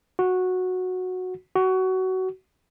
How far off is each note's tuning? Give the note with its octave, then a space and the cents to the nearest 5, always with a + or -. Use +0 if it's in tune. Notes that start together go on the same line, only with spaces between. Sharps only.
F#4 -10
F#4 +20